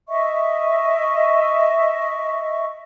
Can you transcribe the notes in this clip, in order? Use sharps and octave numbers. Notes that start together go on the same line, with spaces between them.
D#5 E5 C#6